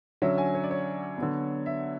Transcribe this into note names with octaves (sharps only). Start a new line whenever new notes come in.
D3 F#3 C#4 E5
G#5
C#5
D5
C#5
D3 F#3 B3
E5